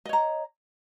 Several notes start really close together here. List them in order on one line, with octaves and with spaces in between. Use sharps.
D#5 C#5 A#5